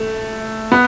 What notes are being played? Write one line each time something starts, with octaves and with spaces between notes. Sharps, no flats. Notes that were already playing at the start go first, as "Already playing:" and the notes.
Already playing: A3
B3